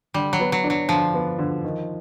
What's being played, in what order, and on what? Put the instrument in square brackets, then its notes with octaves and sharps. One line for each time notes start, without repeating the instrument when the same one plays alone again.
[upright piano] D3 [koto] G3
[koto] F#3
[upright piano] B3
[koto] F#3
[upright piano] D4
[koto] F#3
[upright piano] D3 [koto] F3
[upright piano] B3
D3
D#3